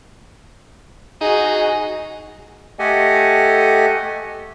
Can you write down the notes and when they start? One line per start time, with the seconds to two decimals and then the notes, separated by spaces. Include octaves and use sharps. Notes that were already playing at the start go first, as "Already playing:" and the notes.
1.21 D#4 F#4 G#4
2.79 A3 G4 A4 D#5 F#5 G#5